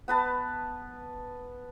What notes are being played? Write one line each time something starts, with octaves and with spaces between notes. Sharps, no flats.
B3 B4 A5